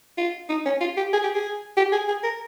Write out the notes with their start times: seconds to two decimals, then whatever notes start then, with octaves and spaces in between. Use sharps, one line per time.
0.18 F4
0.49 D#4
0.66 C#4
0.81 F4
0.97 G4
1.13 G#4
1.24 G4
1.35 G#4
1.77 G4
1.92 G#4
2.08 G#4
2.24 A#4